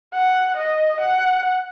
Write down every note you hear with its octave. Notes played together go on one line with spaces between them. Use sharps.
F#5
D#5
F#5